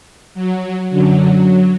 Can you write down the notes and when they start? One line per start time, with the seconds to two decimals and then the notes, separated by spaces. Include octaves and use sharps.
0.35 F#3
0.89 F#2 D3 F#3